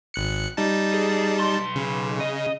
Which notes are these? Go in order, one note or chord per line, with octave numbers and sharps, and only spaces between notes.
G#1 F#6 C#7
G3 D#4 A5
G#4
B1 C6
C#3
D#5